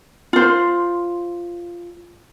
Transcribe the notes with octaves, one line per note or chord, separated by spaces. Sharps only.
F4 C5